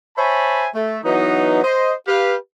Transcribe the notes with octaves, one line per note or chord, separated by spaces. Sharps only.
C5 C#5 E5 G#5 A5 B5
A3
E3 F#3 B3 D#4
C5 D#5
G4 B4 F5